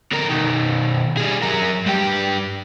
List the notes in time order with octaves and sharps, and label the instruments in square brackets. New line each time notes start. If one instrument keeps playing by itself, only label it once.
[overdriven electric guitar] D3 A#4
B2 D#3
G3 G#4
F#3 A#4
G2 G4